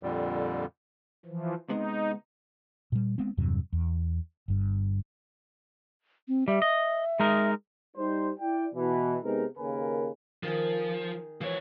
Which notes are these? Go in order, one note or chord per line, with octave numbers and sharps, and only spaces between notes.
F2 A#2 D3 G3
E3 F3
C3 G#3 B3 D#4
A#2 G3
G#3 B3 C4
E2 G2 C3 F#3
E2
G1 G2
C4
G3 E5
D#5
G#3 D#4 A#4
G3 D#4 C5
E4 D5 G5
B2 E3
C3 G#3 B3 D#4 A#4
D#2 C#3 A#3 A#4 B4 G#5
D#3 F3 G#4
E3 F3 C#5